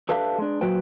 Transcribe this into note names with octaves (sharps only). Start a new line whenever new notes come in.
D4 G4 A4 B4 E5 F5
G#3 D4
A#2 F#3 F#4 B4 C5 G5